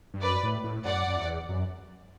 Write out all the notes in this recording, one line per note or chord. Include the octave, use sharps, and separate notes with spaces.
G2
F#2 B4 D5
A2
A2
F#2 D5 F#5
F#2
E2
F#2